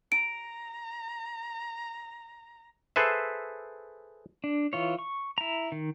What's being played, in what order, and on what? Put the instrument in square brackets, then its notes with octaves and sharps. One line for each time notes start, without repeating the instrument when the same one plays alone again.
[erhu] A#5 [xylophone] D7
[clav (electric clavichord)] G#4 A4 B4 C5 E5
[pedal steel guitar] D4
E3 F4 C#5
C#6
E4 A#5
D#3